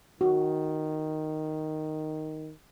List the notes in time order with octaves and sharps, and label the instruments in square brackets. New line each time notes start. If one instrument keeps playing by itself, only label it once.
[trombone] D#3 [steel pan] F#4